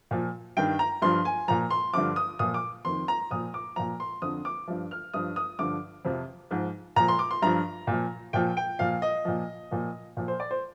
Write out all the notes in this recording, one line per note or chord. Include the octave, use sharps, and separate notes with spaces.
A#2 F3
G2 D#3 G5
A#5
G2 F3 C6
G#5
A#2 F3 A#5
C6
G2 D3 F3 D6
D#6
A#2 F3 D#6
D6
F2 D#3 C6
A#5
A#2 F3 D#6
D6
A#2 F3 A#5
C6
F2 D3 F3 D#6
D6
G2 F3
F6
G2 F3 D#6
D#6
G2 D3 F3 D6
F2 C3 F3
G#2 F3
A#2 F3 A#5
C6
D6
C6
G2 F3 A#5
A#2
F3
A#2 F3 G5
G5
A#2 F3 F5
D#5
A#2 F3
A#2 F3
A#2 F3
C5
D5
C5